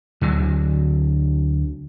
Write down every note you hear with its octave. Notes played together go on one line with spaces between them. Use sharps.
D2 D3 F#3